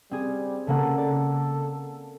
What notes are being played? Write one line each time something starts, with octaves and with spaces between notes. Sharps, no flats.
G3 C4 G#4
C#3 A#3 A4 F#5
A4 D5